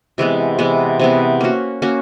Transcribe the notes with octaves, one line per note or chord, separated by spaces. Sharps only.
C3 E3 G#3 B3
C3 E3 G#3 B3
C3 E3 G#3 B3
A#3 C#4 F#4
A#3 C#4 F#4